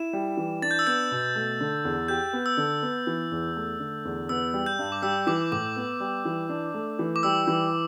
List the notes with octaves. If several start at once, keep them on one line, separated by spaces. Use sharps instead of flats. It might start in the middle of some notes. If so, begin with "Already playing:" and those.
Already playing: E4 E7
G3
E3
D4 A6
G6
E6
B3 G6
B2
A3
D3
E2
G4 G6
B3
E6
D3
B3
E3
E2
A3
D3
E2
B3 E6
G3
G6
G2
D6
G3 E6
E3 D6
A2 D6
B3
G3
E3
D4
A3
E3
D6
G3 E6
E3